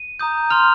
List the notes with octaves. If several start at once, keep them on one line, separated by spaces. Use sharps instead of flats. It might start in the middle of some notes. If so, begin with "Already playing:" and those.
Already playing: D#7
A#5 D#6 G6
C6 F6 F7